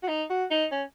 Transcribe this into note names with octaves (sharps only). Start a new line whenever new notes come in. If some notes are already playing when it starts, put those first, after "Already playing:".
F#4
D#4
F#4
D#4
C#4